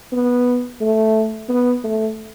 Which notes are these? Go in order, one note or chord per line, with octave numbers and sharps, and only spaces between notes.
B3
A3
B3
A3